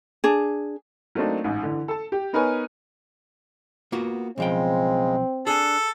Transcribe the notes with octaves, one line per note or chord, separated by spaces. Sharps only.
D4 G#4
F#3 A3 A#3 C4 D4 D#4
A1 G#2
D3 E3
A4 A5
G4
B3 D#4 A#4 B4 C#5 G#5
A#3 B3 F4 F#4
B1 C#3 F3 G#3 C4 G5
D4 G#4 A4 G#5